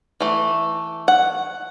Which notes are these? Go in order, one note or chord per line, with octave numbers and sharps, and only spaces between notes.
E3 A3
F#5